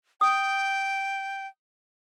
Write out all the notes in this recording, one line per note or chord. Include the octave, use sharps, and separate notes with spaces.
G5 D#6